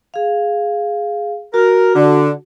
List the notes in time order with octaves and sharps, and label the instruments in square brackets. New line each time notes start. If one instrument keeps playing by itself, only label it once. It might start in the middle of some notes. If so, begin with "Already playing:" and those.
[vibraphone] G#4 F5
[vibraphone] F#4 [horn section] A#4
[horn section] D3